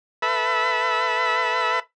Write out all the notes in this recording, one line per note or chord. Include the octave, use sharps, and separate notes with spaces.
A4 B4 E5 B5